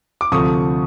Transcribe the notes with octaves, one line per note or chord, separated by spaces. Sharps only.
D6
D2 C3 F3 A3 C#6 D#6